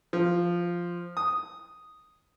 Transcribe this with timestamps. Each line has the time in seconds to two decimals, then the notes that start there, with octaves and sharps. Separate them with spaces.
0.13 F3
1.17 D#6